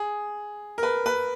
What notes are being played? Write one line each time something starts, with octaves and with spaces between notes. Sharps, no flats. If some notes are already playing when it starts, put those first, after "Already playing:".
Already playing: G#4
A#4
B4
B4